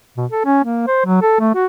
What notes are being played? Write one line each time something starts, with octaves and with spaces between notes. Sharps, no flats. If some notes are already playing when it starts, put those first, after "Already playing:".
B2
A4
C#4
A#3
C5
F#3
A4
A3
F#4